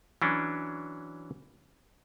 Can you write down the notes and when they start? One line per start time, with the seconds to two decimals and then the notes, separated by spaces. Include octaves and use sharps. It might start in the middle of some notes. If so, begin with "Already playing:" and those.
0.22 E3 F#3 C#4 D4